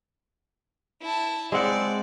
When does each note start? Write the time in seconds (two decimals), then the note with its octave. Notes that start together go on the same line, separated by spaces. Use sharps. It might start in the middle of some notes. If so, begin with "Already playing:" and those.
1.02 E4 A5
1.52 G#3 C4 D5 F#5